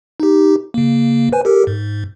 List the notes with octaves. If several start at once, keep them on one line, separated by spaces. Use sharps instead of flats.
D#4 G4
C#3 A#3
B4 C5 G#5
G4 A4 A#4
G#2